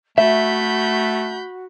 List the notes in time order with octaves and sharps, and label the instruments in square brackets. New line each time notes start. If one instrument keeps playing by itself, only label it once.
[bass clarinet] A3 [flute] F#4 [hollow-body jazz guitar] E5 [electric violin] B5 G6